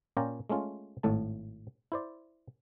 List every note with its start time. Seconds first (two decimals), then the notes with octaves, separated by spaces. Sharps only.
0.17 A#2 C#4 F4 D5 G5 A#5
0.50 G#3 A3 C#4 F4
1.03 G#1 A2 A3 A5
1.92 E4 C5 D5